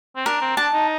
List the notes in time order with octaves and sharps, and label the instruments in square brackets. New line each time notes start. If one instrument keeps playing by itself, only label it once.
[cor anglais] C4
[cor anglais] D4 [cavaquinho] A#4
[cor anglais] C4
[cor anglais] D4 [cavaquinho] A5
[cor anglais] D#4